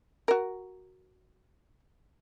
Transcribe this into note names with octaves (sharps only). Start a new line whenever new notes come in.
F#4 A#4